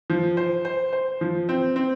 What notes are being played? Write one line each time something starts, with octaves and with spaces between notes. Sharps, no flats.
F3
C5
C5
C5
F3
C4
C4